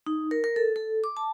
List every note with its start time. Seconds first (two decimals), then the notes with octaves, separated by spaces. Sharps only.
0.07 D#4
0.31 A#4
0.44 A#4
0.56 A4
0.76 A4
1.04 D6
1.17 A5